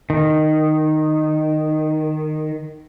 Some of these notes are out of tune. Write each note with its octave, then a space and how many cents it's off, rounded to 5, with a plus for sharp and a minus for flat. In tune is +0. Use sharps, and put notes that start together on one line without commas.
D#3 -10